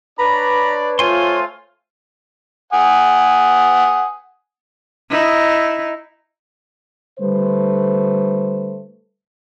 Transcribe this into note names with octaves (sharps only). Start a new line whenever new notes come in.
D4 B4 C#5 D5 A#5 B5
A3 F4 C5 C#5 G#5 C6
F#5 G#5 D#6
D#4 E4
D3 G3 A3 B4 C5